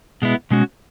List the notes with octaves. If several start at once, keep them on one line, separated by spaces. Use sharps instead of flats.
B2 G#3 B3 E4
B2 G#3 C#4 F#4